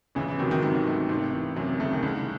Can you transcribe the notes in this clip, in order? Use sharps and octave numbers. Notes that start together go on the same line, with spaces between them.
A1 C#3 E3
C#3 E3
C3 D#3 F#3
C3 D#3
G#2 C3 D#3
A3
G#1 C3
E3
F#2 C3
C#3 A3
D#3
C2 C#3